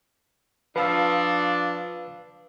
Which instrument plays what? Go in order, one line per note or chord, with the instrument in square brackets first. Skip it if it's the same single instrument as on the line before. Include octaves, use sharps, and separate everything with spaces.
[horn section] F3 D4 [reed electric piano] B4 F5 E6